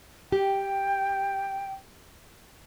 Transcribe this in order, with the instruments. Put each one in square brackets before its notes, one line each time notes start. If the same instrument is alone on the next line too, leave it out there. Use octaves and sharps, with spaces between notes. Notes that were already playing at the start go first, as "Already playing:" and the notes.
[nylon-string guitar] G4 [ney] G5